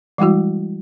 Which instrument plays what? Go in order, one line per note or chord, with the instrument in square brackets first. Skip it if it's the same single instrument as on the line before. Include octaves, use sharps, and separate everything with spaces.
[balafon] E3 G3 G#3 E4 F#4